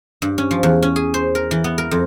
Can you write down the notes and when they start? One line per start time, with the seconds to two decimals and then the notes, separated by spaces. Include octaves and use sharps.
0.22 G2
0.38 C#4
0.51 F3
0.63 E2
0.82 C#4
0.96 G#4
1.14 C5
1.35 A#4
1.51 E3
1.64 B3
1.78 A#4
1.91 F2